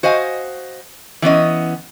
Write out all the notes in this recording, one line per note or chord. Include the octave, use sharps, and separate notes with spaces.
F#4 C5 D#5 F5 G#5
E3 B3 C#4 D#5